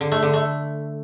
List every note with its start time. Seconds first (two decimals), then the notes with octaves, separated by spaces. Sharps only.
0.01 D3
0.12 A3
0.22 D3
0.33 A3